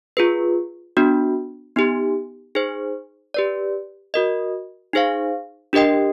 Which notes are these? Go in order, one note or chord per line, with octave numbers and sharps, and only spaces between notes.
F4 G#4 B4
B3 D4 F#4
B3 D#4 G4
D#4 G#4 C5
G4 B4 D5
F#4 A#4 D#5
D#4 G#4 C5 F5
D4 G4 A#4 D#5 G5